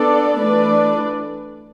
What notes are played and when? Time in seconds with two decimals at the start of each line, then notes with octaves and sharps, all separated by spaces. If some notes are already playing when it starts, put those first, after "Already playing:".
Already playing: B3 D4 A4 D5
0.39 E3 A3 D4 B4 D5